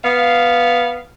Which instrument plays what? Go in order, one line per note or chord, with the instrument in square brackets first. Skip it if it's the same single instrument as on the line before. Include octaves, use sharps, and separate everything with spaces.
[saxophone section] B3 F5